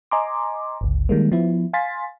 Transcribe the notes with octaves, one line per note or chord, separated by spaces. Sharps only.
D#5 G#5 A#5 C6 D6
G1 C#2
D#3 G3 G#3 A#3
F3 B3 E4
F5 G#5 C6 A6 B6